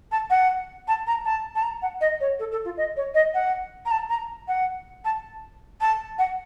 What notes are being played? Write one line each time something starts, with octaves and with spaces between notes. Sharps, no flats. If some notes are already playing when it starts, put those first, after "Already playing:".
A5
F#5
A5
A#5
A5
A5
A#5
F#5
D#5
C#5
A4
A4
F4
D#5
C#5
D#5
F#5
A#5
A5
A#5
F#5
A5
A5
F#5